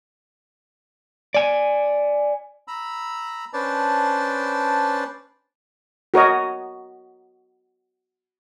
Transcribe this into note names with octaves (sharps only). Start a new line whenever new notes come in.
D5 G#5
A#5 B5 E6
C#4 D4 B4 C5 D5 A5
F#4 A#4 C#5 D#5